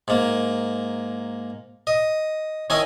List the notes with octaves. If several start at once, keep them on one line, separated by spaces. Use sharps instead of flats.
G#2 A#3
D#5
D#3 C#4 E4 D#5 G#5